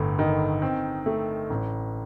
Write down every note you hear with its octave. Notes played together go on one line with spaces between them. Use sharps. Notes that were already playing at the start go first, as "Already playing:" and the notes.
Already playing: G1 A2
D#3
C4
A3
A1